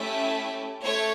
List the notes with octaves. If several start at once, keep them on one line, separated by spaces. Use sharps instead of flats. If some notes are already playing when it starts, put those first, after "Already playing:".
Already playing: A3 C#4 E4 G4 E5
A3 C#5